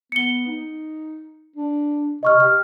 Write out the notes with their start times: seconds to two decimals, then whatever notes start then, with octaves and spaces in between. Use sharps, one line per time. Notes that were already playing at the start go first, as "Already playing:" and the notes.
0.12 B3 C#7 G7
0.47 D#4
1.56 D4
2.23 C3 D#5 C#6 F6
2.40 G4 F6